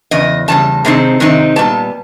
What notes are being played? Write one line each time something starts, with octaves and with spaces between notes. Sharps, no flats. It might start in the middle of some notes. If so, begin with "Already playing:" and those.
E2 C#3 D#5
E2 C#3 G3 A5
C3 D#3 G#3 C4 D#4
C3 D#3 G#3 C4 D#4
A#2 G3 B3 A5